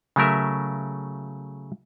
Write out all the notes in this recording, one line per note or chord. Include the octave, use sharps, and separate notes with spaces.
C#3 F#3 A3 A#4 E5